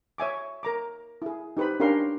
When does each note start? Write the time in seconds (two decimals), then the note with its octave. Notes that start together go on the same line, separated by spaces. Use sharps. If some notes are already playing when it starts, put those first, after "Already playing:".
0.18 C#5 E5 G#5 D6
0.63 A#4 A#5 D6
1.22 E4 G#4
1.57 D#4 G4 B4 C5 B5
1.80 C#4 D4 G4 A#4 F5 C6